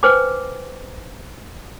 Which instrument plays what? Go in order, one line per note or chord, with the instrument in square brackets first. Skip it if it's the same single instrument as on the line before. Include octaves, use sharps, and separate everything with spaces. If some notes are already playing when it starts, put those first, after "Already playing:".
[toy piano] B4 C5 G5 G#5 D6